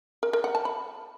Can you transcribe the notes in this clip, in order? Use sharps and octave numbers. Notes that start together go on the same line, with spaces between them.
A#4
A#4
F#5
A5
B5